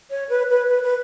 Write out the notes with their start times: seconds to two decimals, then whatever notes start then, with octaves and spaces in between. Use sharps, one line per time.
0.10 C#5
0.29 B4
0.50 B4
0.69 B4
0.83 B4